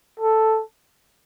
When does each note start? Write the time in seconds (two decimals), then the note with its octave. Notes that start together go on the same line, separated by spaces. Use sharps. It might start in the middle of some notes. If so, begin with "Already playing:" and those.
0.20 A4